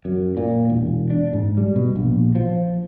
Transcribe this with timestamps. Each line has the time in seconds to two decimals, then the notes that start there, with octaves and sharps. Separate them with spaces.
0.05 F#2
0.37 A#2
0.70 E1
1.10 D4
1.33 G#2
1.57 G3
1.76 B2
1.96 A#1
2.35 F3